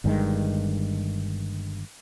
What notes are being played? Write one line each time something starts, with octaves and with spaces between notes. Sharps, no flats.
G1 G2 D#3 G#3